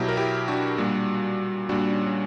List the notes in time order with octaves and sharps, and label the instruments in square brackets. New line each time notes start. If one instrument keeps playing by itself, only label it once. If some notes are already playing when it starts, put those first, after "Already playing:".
Already playing: [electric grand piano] B2 F#3 E4 G4
A#4
E4 G4
D4 F#4
A#2 G3
A#2 G3 D4 F#4
C#4
C#4